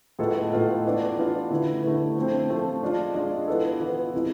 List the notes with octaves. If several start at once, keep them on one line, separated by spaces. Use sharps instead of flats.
A2 G#3 B3 F4 A4
A2 G#3 B3 F4 A4
E3 B3 D4 F4
E3 B3 D4 F4
D3 A3 E4 B4
D3 A3 E4 B4
F3 A3 C4
F3 A3 C4
G#3 D4 F4
G#3 D4 F4
E3 B3 F4 A4
E3 B3 F4 A4
C3 E3 G#3